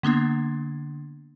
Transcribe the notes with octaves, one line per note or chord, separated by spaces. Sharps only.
D3 A#3 B3 D4